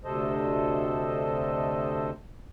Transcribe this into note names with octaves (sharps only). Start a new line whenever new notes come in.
D2 C3 A4 C5 D#5